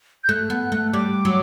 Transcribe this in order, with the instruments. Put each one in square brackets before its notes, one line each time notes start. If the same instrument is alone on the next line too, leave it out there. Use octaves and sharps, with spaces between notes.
[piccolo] G6
[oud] A3 [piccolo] F#6
[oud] B3
A3
[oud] G3 [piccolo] D6
[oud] F#3